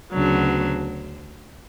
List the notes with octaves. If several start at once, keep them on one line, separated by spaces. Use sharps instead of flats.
D2 C#3 F#3 B3 D4